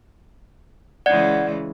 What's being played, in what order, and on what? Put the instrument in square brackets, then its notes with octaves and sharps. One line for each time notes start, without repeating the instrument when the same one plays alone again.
[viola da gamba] C#3 E3 G#3 [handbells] D5 [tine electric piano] F#5 G#6